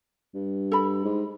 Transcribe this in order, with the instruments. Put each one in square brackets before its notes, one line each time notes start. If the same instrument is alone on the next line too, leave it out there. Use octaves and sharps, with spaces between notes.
[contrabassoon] G2
[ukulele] A4 B5
[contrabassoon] G#2